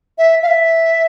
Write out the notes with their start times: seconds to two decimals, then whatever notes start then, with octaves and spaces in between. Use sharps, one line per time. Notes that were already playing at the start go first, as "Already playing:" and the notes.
0.18 E5
0.43 F5
0.48 E5